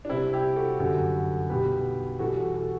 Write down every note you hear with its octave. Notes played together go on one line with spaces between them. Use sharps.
D4
C2 C3 G3 C4 E4
E4 G4
F#4 A4
G1 F#2 D3 G3 F#4 A4
B1 B2 G3 G4 B4
E2 B2 G3 F#4 A4
F#4 A4
F#4 A4